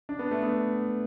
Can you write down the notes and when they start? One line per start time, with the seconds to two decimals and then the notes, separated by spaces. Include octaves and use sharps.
0.09 D4
0.19 B3
0.31 A3
0.42 B3